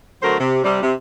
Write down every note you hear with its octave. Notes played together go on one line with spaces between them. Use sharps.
D3 F#3 A3 F#4 A#4 C5
C3
C3 G3
C3